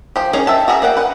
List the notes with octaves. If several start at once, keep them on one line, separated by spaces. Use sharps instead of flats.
F3 G4
C#4 D#4 G#4 A#4 C#5
E5 G5 A5
F#4 G#4 A#4 D#5 E5
A#3 D5 F#5 G5
B4 F#5